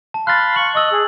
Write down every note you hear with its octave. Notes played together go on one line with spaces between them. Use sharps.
A5
F5 B5 C6 F#6 A6
C#6 F#7
D#5 C#6 E6 F#7
G#4